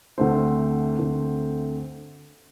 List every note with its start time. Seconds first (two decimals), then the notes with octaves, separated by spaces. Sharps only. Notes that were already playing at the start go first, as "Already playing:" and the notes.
0.18 D2 D3 A3 C4 C5
0.98 D2 D3 A3 C4